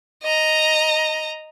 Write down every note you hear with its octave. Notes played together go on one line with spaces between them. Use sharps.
D#5 A#5